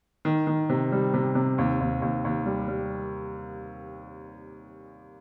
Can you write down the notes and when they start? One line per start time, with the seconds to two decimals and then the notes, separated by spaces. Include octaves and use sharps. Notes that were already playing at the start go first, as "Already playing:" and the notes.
0.25 D#3
0.47 D#3
0.69 C3
0.92 G3
1.14 C3
1.35 C3
1.58 D#2
1.80 D#2
2.02 D#2
2.25 D#2
2.45 G3
2.68 G3